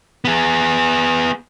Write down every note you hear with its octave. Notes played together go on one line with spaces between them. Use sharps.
B3 G#4